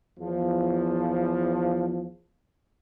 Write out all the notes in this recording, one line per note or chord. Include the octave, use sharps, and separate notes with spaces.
E2 F3